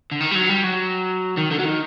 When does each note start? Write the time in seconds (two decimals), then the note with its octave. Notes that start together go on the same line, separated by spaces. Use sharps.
0.11 D3
0.20 D#3
0.31 G3
0.35 F#3
0.49 G3
0.64 F#3
1.37 D#3
1.51 D3
1.59 F#3
1.65 D#3